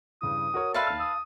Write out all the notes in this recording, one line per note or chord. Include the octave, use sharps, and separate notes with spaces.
G2 C#3 E3 D#6
F#4 A#4 C#5
A4 B4 D5 E5 F5 A5 C6
D#2 F6
D#6 E6